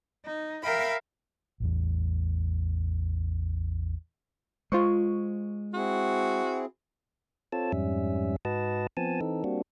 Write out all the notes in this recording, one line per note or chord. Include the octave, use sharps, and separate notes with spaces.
D#4
A#4 E5 F5 G5 A#5 B5
A1 E2
G#3 F4 C5 C#6
C4 E4 F#4 G#4
C4 F4 A4 C#5 A5
F2 G#2 G3 C#4 E5
G#2 F#4 B4 D#5 A5
F3 B3 C4 G#5 A5
E3 C4 D#4 A4
G3 A#3 C4 D4 F#4